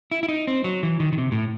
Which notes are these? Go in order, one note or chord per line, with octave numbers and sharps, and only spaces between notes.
E4
E4
D#4
C4
F#3
E3
D#3
D#3
C3
A2